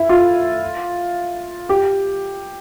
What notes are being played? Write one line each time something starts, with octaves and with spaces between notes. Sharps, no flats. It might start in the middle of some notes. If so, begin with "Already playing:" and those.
Already playing: E4
F4
G4